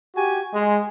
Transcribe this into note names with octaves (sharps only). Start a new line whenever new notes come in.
F#4 G4 G#5
G#3